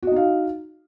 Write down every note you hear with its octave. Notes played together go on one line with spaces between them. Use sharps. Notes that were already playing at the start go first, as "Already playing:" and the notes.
D#4 F#4 D#5 F5